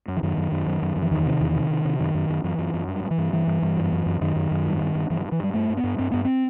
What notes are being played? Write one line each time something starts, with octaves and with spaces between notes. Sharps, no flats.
F#2
E3
F#2 D#3
F#2
F#2
F#2
F#2
F#2
E3
E2 D#3
C3
E2
C3
C3
C3
F#2 D#3
F#2
F#2
F#2 E3
F#2
F#2
G2
G2
E3
G2
G2 E3
G2
G2
F#2
F#2
F#2
F#2 D#3
F#2
F#2
G2
G2
G2
G2 E3
E3
G2
E3
G2 G3
G2 A3
G2
B3
G2
G2 C4
G2 B3
C4